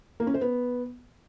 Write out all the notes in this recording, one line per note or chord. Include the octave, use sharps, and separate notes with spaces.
A#3
C#4
C5
B3